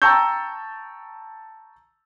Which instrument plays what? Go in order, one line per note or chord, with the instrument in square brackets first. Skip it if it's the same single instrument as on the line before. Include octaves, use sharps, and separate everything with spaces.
[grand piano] G5 A5 A#5 C#6 E6 G6